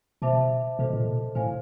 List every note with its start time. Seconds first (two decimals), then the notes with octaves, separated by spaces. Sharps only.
0.22 B2 C5 E5 A5 D6
0.79 B2 A4 C5 D#5
0.93 A#2
1.35 A2 C5 F5 G#5